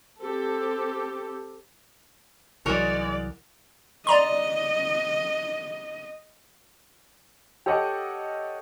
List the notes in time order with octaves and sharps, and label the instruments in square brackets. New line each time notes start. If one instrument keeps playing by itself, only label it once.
[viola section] C4 G4 A4
[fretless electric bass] C2 E3 F#3 [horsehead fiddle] G#3 D5 [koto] F#4 A#4 C#5
[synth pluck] D5 A#5 C6 [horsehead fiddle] D#5
[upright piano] G4 A4 C#5 D#5 F#5 G5